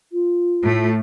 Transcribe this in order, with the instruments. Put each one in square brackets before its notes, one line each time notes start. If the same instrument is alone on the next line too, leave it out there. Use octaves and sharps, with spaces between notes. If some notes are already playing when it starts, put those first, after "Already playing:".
[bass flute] F4
[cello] A2 A3